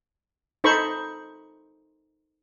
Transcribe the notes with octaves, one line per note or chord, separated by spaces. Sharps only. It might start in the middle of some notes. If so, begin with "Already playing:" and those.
D#4 A4 C5 B5 C#6